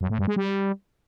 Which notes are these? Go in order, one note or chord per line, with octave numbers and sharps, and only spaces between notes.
F#2
A2
G2
G#3
G3